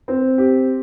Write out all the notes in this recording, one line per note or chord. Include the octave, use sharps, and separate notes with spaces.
C4
G4